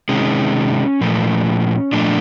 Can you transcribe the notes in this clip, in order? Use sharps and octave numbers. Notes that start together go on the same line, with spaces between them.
C3 D#3 G#3 C#4
A#2 F3 A3
A#2 F3 A3 D4